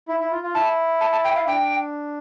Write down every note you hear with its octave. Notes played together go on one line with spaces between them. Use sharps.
E4
E4
F4
F4
E4 A5
A5
A5
G5
F5
D4 G5